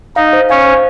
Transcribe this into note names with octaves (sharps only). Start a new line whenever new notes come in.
D#4 D#5 F5
C5
C#4 C#5 F5
C5